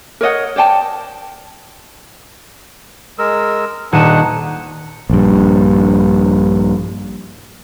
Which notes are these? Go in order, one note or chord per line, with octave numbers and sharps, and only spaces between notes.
A#4 C#5 D#5 F#5
C5 D5 G5 A5
G#3 A#4 E6
D#1 D4 D#4 F#5 D#7 E7
A#1 G2